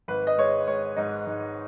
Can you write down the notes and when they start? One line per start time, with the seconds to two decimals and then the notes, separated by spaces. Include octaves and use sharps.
0.08 G#1 B4
0.27 D#5
0.38 G#3 C#5
0.67 G#3 C#5
0.97 G#2 D#4
1.27 G#2